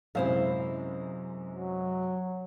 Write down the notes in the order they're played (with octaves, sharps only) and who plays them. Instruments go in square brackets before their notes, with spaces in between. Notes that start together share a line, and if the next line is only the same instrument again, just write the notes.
[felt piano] F#2 C3 G#3 [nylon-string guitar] E4 C5 F5
[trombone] F#3